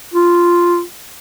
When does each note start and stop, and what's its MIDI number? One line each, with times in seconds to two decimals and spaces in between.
0.14 0.81 65